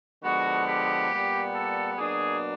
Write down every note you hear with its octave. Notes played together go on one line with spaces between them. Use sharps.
D3 F3 G#3 B3 F#4
G4
A#2 G3 B3
A4
B2 F#3 A#3 D4 G#4